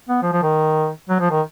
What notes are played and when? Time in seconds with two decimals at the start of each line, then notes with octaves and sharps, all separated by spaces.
0.09 B3
0.22 F3
0.33 F3
0.43 D#3
1.09 F#3
1.20 F3
1.30 D#3